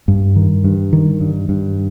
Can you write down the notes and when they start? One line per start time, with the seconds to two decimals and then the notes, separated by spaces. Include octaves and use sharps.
0.08 G2
0.36 D#3
0.64 G2
0.93 D#3
1.20 G2
1.49 G2